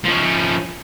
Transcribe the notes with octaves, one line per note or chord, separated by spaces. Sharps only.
F3 C#4